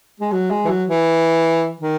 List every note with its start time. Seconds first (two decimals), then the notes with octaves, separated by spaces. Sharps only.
0.20 G#3
0.32 F#3
0.50 G#3
0.65 E3
0.68 F#3
0.87 E3
1.80 D#3